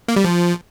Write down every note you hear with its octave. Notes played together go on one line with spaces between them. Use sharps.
A#3
G3
F3